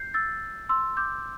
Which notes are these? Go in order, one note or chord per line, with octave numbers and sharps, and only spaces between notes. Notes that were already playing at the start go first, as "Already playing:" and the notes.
Already playing: G6 C7
E6 A6
C6 E6
D6 G6